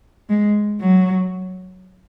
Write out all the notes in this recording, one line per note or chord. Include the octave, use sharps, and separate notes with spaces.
G#3
F#3